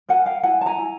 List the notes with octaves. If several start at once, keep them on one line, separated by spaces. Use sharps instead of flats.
A#4 F#5 G#5
F5 G5
E4 F#5 G#5
A5
G#5 A#5
E4